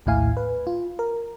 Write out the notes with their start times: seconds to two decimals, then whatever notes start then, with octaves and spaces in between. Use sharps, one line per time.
0.06 A#1 D#2 A2 E4 F5 G#5
0.37 B4
0.67 F4
0.99 A#4